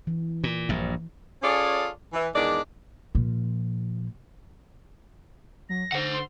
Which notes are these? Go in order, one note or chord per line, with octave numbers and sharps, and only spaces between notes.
E3
A#2
A#1 G2
C#4 F4 G#4 A4 C#5 D5
E3
E2 D#3 G#3 D4 D5
A#2 F3
F#3 A#6
D3 C5 F#5
C6